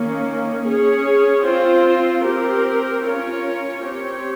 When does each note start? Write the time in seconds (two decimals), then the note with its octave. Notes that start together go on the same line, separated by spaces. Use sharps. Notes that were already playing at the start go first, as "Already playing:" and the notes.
Already playing: D#3 A#3 C#4
0.63 C#4 G#4 C#5
1.44 C4 F4 C5
2.23 C4 G4 A#4
3.04 C#4 F4 A#4 C#5
3.84 C4 G4 C#5